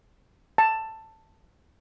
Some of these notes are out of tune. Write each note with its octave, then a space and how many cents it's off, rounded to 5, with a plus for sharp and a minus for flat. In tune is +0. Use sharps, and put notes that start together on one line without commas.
A5 +10